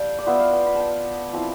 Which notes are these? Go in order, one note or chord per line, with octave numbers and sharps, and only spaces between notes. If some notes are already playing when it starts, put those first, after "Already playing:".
Already playing: G3 F5 G5 A5
D5
B3 F4 E5
F5
G5
B5
G5 A5
F3 C4 E4